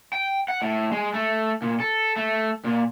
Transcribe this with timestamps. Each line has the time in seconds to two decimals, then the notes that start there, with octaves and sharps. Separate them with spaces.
0.13 G5
0.48 F#5
0.62 A2
0.92 G#3
1.14 A3
1.62 A#2
1.80 A4
2.16 A3
2.64 A#2